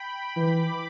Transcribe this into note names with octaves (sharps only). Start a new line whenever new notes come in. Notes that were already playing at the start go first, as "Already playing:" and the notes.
Already playing: G5 B5
E3 B5 D6